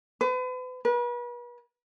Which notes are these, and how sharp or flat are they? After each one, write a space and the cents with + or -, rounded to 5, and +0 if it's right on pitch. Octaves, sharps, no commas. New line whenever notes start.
B4 +40
B4 -40